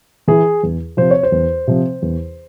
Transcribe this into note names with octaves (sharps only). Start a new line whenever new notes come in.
E3 G#4
E2
C3 F3 C5
C#5
C5
E2
C3 F3
E2